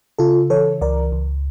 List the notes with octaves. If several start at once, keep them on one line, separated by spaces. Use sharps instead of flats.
C#3 F4 A4
E3 A4 C#5
C#2 A#4 D5
C#2